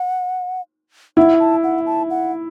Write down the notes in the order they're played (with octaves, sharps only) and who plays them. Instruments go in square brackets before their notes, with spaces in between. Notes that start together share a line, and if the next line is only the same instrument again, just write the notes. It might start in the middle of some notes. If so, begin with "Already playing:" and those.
Already playing: [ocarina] F#5
[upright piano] E4 [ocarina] F#5
[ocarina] A5
F#5
A5
F#5